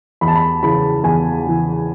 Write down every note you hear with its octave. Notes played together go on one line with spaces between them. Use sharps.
E2 B5
A5
B5
C#3 E3 B5
E2 G#5
C#3 E3